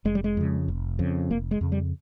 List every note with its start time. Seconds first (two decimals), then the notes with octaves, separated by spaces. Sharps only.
0.05 F1 G#3
0.15 G3
0.24 G#3
0.37 F2 C#3
0.68 F1
0.99 F2 C#3
1.31 F1 A#3
1.51 G#3
1.61 F2 C#3
1.72 G3